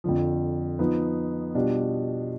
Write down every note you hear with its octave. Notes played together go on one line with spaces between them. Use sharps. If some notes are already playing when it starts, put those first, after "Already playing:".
F2 D3 F3
F3 B3 D#4
B2 G3 D4 F4